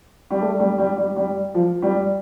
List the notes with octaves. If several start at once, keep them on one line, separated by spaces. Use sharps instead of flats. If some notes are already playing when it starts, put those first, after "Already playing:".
G3
A3
G3
G3
G3
G3
F3
G3